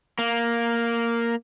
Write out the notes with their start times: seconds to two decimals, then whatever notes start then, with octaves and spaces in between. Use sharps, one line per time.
0.19 A#3